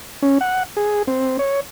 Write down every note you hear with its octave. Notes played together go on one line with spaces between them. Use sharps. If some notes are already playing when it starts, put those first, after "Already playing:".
C#4
F#5
G#4
C4
C#5